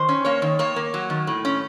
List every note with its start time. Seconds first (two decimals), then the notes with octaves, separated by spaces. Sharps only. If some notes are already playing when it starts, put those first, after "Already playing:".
Already playing: D#3 C5
0.09 C#4
0.25 A#3 C#5
0.42 D#3
0.59 A#3 C#5
0.76 A#3
0.94 F#3
1.10 D#3
1.27 A2
1.45 C#4